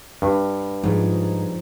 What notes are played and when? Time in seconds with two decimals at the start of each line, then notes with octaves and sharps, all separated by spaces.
0.22 G2
0.83 G#2 F3 D#4